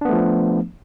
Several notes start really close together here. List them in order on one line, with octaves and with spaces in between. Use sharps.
D4 B3 A3 F3